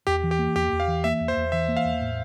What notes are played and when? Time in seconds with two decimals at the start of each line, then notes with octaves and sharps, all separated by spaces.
0.07 E2 G4
0.23 E3
0.31 G4
0.39 A#3
0.55 E2 G4
0.72 E2
0.80 F5
0.88 E3
1.04 A#3 E5
1.20 E2
1.28 C5
1.37 E2
1.52 E3 E5
1.68 A#3
1.77 F5
1.85 E2
2.01 A2